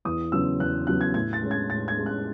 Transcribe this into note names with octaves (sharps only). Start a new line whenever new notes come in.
E2 D#6
C#3 F#3 B3 E6
E2 F#6
C#3 F#3 B3 F#6
G#6
A2 G#6
A6
G#3 C#4
G#6
A2 A6
G#6
G#3 C#4
F#6